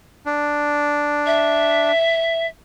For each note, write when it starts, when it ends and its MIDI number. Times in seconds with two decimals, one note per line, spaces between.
0.26 1.92 62
1.26 2.46 76